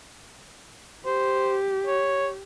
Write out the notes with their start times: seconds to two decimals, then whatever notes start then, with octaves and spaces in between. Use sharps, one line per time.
1.06 G4 C5
1.87 C#5